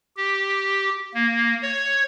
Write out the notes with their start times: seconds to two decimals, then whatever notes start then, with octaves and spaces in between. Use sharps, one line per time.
0.16 G4
1.14 A#3
1.62 C#5